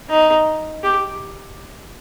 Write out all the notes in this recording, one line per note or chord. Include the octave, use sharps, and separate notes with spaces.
D#4
G4